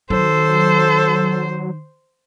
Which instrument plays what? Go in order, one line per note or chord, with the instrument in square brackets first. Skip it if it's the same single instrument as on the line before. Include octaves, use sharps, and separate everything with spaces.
[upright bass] D#3 [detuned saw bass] F#3 [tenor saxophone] A4 [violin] C5